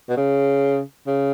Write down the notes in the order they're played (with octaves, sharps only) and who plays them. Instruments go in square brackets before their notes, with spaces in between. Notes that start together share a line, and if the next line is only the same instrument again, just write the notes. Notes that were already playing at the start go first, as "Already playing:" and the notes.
[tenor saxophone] B2
C#3
C#3